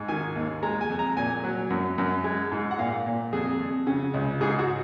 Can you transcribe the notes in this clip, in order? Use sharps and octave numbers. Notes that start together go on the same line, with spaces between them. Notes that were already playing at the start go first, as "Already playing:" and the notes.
Already playing: G#2
D#3 G#5
D#2
G#3 A#5
G#5
F2
A#5
A#2 G#5
F#3
F#2
F#2
G#3
G#2
F#5
A#2 F5
A#2
F2 G#4
F2
C#3
C#2
G#2 G#4
F#4